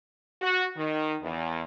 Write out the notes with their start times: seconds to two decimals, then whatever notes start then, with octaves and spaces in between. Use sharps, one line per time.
0.42 F#4
0.76 D#3
1.22 E2